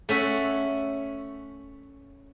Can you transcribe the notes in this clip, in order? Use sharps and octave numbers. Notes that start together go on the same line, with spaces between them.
A3 C#4 E5 F#5